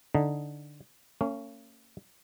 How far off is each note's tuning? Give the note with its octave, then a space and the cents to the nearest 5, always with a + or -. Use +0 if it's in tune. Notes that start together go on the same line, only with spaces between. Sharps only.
D3 +0 D#4 +0
A#3 -45 C#4 +0